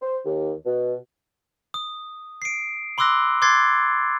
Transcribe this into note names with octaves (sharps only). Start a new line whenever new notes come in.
C5
D#2
B2
D#6
C7 D7
B5 C6 D6 E6 F#6 A#6
C6 D6 F#6 G#6 A6 C7